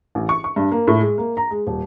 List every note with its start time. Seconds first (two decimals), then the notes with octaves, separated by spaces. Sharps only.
0.15 A1
0.29 C#6
0.44 C#6
0.56 G2
0.72 A#3
0.87 A2
1.00 G#3
1.18 A#3
1.37 A#5
1.51 G#3
1.67 D#1